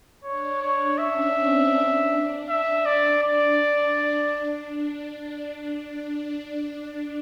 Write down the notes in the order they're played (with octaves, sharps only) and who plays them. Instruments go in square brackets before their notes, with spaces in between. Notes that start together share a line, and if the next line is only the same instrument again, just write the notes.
[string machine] D4 [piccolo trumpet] C#5
[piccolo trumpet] C#5
[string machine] C#4 [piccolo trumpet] E5
[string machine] C4
D4
[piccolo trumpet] E5
D5
[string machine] D4 [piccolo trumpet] D5